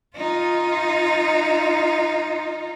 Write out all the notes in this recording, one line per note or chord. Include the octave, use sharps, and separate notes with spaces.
D#4 F4